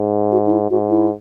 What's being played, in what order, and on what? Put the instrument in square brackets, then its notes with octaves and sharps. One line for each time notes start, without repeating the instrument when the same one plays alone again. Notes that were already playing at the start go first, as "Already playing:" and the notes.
Already playing: [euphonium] G#2
[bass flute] F#4
D#4
E4
[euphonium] G#2 [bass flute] F#4
[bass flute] E4